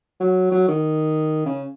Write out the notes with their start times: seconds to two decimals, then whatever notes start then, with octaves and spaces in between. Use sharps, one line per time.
0.20 F#3
0.51 F#3
0.68 D#3
1.46 C#3